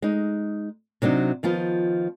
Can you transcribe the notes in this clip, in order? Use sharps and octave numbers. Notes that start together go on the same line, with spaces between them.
G#3 D#4
C3 F#3 D4 D#4
D#3 F3 B3 F4